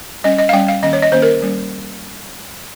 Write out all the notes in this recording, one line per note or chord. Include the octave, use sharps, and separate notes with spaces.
G3 C#4 D#5
D#5
F5
G3 C#4 G5
F5
D#3 A#3 C#4 D#5
C#5
D#5
D#3 A#3 C#4 C5
A#4
G3 A#3 C#4